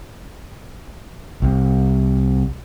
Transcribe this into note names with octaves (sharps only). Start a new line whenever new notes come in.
C2